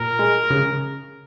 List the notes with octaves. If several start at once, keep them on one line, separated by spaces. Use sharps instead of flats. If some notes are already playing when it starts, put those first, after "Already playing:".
Already playing: A#2 A#4
G#3
C#3